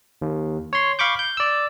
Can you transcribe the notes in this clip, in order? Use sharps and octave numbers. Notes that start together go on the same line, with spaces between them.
D#2
C#5 C6
F5 B5 C#6 D6 G6
G6
D5 E6